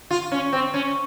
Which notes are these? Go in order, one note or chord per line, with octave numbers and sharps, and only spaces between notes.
F4
C#4
C4
C#4